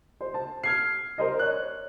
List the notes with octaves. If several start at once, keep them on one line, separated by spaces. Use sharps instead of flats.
C5
A5
F6 G#6 C7
A#4 C5 D#5
C#5 F#6